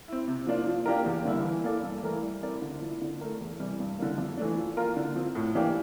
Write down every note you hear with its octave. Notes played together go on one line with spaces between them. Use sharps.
C4 E4
C3
F3 A#3 D4 F4
F3
A#3 D4 G4 A#4
E2
D3 G3 A#3 E4
E3
A#3 E4 A4 D5
G2
E3 A3 E4 A#4
G3
C4 E4 A#4 D5
D3
F3 A#3 E4
D3
A3 E4 A#4
E2
C3 E3 G3
G2
D3 G3 A#3
F2
E3 A3 D4
F3
A#3 F4 A#4
D3
F3 C4
A2
E3 A#3 D4 G4